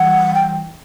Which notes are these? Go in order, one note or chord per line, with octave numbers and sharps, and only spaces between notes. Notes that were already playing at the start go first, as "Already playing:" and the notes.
Already playing: E3 G3 F#5
G5